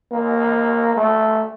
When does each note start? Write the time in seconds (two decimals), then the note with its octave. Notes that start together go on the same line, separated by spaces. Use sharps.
0.12 A#3
0.96 A3